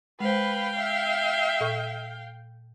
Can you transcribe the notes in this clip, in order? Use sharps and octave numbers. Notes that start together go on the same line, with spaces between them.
G#3 B4 C5 F5 G5
E5
A#2 A4 C#6